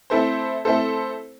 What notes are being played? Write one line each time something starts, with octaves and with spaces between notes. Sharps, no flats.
A3 C4 E4 A4 C5
A3 C4 E4 A4 C5